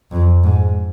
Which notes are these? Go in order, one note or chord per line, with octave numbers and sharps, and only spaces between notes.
F2
G#2